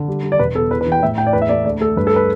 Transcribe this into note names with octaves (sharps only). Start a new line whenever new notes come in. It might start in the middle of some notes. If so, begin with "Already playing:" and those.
Already playing: D3
G3
G3
D5
E1 B4
B3 A4
E2 B4
B4
E3
G5
A2 E5
A2 G5
D5
E2 B4
E5
A3 D5
D2 D5
A3 A4
G2 B4
A4
B4